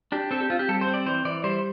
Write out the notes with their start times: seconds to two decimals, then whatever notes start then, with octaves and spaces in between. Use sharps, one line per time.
0.12 D4 G4
0.31 C4 A4
0.40 G4
0.50 C4 F4
0.59 G4
0.69 G3 A4
0.81 C5
0.87 C4
0.94 D5
1.06 E3 C5
1.25 E3 D5
1.44 G3 C5